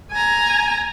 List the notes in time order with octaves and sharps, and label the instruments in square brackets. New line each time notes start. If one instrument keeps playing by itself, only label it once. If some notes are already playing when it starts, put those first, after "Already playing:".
[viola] G#5 A#5